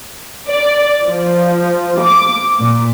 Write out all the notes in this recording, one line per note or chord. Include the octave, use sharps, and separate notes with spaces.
D5
F3
D6
A#2